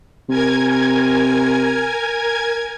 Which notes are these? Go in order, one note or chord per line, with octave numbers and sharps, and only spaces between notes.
C3 A#4 G#5 G#6